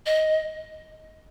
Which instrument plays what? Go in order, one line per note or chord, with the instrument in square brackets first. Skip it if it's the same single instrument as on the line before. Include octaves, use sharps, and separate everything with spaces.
[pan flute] D#5